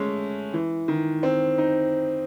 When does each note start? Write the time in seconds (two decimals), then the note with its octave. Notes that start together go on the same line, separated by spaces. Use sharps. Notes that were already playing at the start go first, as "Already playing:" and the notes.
Already playing: G#3 A3 C#4
0.53 E3
0.88 D#3
1.23 C4
1.58 D#4